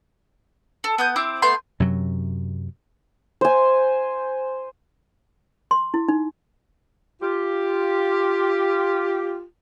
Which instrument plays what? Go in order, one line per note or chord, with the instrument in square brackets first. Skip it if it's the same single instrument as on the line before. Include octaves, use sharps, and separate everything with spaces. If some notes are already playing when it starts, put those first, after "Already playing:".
[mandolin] A4
B3 D#6 G6
C4 E4 C5 D6
A3 B3 C6 G6
[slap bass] F#2 C3 F#3
[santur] C5 G#5
[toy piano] C6
E4
D#4
[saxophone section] F4 G4